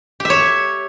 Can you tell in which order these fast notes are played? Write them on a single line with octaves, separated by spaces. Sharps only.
G4 E5 C#5